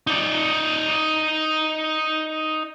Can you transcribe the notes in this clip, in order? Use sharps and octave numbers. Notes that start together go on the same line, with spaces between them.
D#4 D5